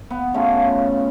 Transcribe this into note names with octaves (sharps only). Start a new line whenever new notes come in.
B3
C#3 A3 C#4 F4